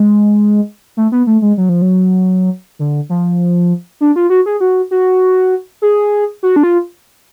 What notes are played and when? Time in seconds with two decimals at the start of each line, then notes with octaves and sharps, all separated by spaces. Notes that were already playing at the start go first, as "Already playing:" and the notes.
Already playing: G#3
0.97 A3
1.12 B3
1.27 A3
1.42 G#3
1.57 F#3
1.69 F3
1.82 F#3
2.79 D3
3.09 F3
4.01 D4
4.16 F4
4.30 F#4
4.46 G#4
4.60 F#4
4.91 F#4
5.82 G#4
6.43 F#4
6.56 D4
6.63 F4